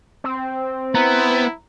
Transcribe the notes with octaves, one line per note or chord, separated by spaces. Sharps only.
C4
B3 E4 A#5